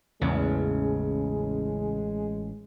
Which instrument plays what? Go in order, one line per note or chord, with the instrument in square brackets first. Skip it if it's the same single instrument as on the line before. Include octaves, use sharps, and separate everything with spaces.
[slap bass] A1 [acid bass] E2 [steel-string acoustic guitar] C#3 [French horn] G#3